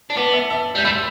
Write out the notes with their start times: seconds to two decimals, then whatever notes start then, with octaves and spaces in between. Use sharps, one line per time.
0.10 D4
0.17 B3 A5 D6
0.33 E5 A5
0.50 E5 A5
0.75 G3 G6
0.84 A3 B5 E6